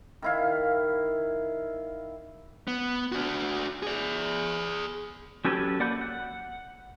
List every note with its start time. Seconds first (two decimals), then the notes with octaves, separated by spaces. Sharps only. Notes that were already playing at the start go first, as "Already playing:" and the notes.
0.22 D#3 E4 F5
2.68 B3
3.12 D4 F#4
3.83 G#4 D5
5.45 F#3 C#4 G4 A4 B4
5.80 A#3 D5 F#5 B5 G6
6.01 F#5